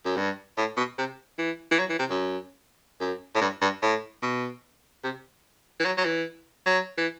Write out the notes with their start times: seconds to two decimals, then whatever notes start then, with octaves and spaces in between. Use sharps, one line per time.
0.05 F#2
0.17 G2
0.58 A2
0.77 B2
0.98 C3
1.38 E3
1.71 E3
1.79 F#3
1.89 E3
1.99 C3
2.10 F#2
3.01 F#2
3.35 A2
3.41 G2
3.62 G2
3.82 A2
4.22 B2
5.04 C3
5.80 E3
5.85 F#3
5.97 F#3
6.05 E3
6.66 F#3
6.98 E3